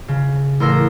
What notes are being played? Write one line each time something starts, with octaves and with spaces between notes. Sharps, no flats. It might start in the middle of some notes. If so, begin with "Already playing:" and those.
C#3
A1 A#4 C6 E6 A#6